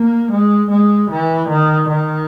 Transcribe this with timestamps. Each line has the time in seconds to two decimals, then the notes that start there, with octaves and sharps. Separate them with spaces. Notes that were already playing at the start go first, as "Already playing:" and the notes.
Already playing: A#3
0.32 G#3
0.71 G#3
1.11 E3
1.49 D#3
1.89 D#3